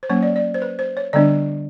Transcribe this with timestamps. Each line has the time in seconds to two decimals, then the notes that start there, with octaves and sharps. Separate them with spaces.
0.03 C5
0.10 F#3 A#3 C#4 C#5
0.23 D5
0.36 D5
0.54 C5
0.62 B4
0.79 C5
0.97 C#5
1.13 D3 G3 B3 D4 D5